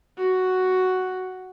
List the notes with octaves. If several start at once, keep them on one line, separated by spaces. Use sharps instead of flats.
F#4